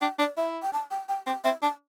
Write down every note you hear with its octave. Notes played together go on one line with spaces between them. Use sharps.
D4 G5
D4 D5
E4 E5
G5
A5
G5
G5
C4 G5
C4 E5
D4 A5